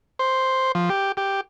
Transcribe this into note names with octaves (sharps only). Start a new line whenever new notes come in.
C5
F3
G4
G4